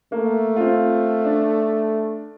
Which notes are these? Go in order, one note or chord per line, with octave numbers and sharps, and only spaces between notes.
A3 A#3
C4 F4
D4